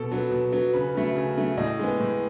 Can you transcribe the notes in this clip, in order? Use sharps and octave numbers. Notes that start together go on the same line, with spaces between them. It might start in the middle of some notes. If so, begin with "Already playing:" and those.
Already playing: B2 A4
F#3 B3
B2
F#3 B3
C#3 B4
F#3 A3
C#3
F#3 A3
A2 D#5
G#3 B3
A2